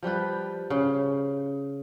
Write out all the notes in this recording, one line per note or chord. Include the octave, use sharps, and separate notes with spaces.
F3 G3 G4 B4
C#3